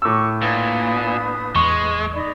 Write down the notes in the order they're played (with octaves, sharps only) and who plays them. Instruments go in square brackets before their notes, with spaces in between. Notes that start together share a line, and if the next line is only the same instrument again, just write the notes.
[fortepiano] A2 E6 [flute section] C#6 D6
[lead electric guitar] A#2 [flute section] D4 B4 D#6
[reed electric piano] E2 C#6 [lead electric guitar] G#3
[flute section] D#4 D5 B5